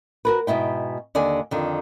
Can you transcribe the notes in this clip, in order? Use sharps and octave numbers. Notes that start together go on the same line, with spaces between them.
F#4 A#4 B4
G#2 B2 E4 G5
D#2 D3 D5 G#5
F2 D3 D#3